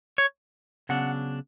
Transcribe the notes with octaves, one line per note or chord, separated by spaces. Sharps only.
C#5
C#3 F#3 B3 D4 F#5